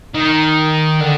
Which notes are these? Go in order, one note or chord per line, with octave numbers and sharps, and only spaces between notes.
D#3
D3